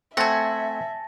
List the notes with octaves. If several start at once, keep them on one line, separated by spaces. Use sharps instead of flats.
A3 C4 E5 F#5 G#5 A5 A6 A#6